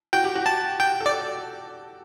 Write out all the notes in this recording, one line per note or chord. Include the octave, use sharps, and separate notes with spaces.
F#4 G5
G4
F#4
A5
G5
A4
D5